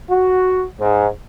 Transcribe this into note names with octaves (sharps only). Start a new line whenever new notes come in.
F#4
G#2